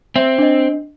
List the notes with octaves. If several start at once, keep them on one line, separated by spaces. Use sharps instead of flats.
C4 E5
D4 D#5